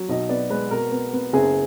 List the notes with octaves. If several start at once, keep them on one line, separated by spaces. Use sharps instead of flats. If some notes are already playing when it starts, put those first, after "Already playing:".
Already playing: F#3
B1 D#5
B3 D5
G#3 B4
B2 A#4
B3
B3
F#1 G#4